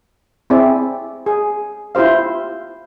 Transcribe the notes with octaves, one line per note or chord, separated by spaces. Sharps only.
C4 E4 G#4 D5 E5
G#4
E4 F4 G4 C5 F5